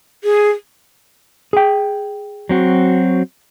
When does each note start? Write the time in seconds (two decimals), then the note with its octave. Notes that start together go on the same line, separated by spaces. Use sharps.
0.24 G#4
1.53 G#4 G5
2.49 F#3 C4 F#4